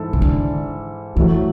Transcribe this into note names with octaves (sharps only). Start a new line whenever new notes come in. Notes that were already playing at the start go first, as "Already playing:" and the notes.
Already playing: G#2 E3 E4 A4
C#3
D3
A2 E3 F#3 A3